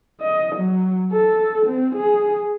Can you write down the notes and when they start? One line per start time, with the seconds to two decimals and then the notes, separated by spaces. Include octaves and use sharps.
0.21 D#5
0.56 F#3
1.13 A4
1.66 C4
1.96 G#4